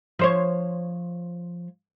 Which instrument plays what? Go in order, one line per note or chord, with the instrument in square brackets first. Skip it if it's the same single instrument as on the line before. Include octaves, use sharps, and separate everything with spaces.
[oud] F3 C5 C#5